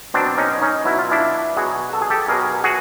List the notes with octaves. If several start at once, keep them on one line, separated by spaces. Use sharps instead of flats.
B2 F#3 C4 D4
C#4 D#4
C#4 D#4
B2 F#3 E4
F4
D4 E4
B2 F#3 F#4 G#4
A4
G#4
G4 A4
B2 F#3 G#4 A#4
F#4 G#4